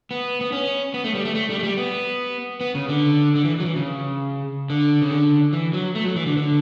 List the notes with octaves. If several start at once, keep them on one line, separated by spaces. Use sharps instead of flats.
B3
B3
C#4
B3
A3
G3
A3
A3
G3
A3
G3
B3
B3
C#3
D3
D3
E3
F#3
E3
C#3
D3
C#3
D3
E3
F#3
A3
F#3
E3
D3
D3